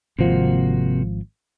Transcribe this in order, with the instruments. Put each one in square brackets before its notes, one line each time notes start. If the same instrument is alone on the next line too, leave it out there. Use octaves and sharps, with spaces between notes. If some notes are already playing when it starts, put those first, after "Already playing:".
[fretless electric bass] G#1 F3 [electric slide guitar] C3 A#3 F#4